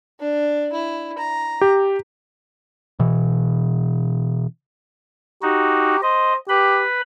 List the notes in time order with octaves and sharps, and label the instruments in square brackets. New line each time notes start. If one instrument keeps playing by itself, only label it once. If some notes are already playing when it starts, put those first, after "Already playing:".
[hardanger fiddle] D4
E4
A#5
[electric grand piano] G4
[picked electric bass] B2 E3
[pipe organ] D#4 F#4 [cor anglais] G4
[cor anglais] C5 [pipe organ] D#5
[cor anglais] G4 [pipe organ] B4 B5